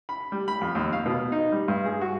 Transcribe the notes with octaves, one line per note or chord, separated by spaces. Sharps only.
B5
G3
B5
F2
D#2
F5
B2
D#4
G3
G2
G#4
F#4